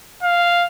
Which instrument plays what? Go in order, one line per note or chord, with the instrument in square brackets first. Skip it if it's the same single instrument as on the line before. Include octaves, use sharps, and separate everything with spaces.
[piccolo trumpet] F5